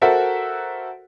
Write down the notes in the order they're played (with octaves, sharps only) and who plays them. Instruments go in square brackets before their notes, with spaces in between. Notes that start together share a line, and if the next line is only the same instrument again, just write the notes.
[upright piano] F#4 A4 A#4 C5 E5 F#5